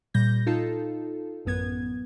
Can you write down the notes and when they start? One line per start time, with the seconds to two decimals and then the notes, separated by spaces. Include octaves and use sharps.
0.14 A#2 G3 G6 A#6
0.47 D#4 F4 A4
1.45 A1 F#2 B3 G#6